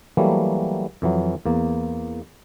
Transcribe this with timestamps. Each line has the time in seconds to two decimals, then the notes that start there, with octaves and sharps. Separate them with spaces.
0.17 E3 F#3 G3 A3 A#3
1.02 F2 E3 F#3
1.46 E2 A#3